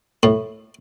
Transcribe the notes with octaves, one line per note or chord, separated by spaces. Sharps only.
A2